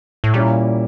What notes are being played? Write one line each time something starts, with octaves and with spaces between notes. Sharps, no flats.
A2
A#2 G3 A#3 C#4 E4